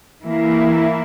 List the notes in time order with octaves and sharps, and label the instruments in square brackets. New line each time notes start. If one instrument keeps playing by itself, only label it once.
[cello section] E3 A#3 E4